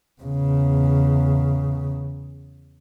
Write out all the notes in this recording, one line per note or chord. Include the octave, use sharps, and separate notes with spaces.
E2 C#3